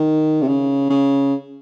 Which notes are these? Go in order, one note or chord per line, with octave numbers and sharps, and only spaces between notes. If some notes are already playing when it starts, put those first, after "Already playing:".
Already playing: D#3
C3
C#3
C#3